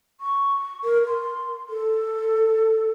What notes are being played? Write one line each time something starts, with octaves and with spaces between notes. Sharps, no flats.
C#6
A#4
C6
A4